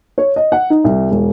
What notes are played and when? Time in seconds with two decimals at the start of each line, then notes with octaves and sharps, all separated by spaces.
0.18 C#5
0.36 D#5
0.52 F#5
0.70 D#4
0.84 C2
1.11 E1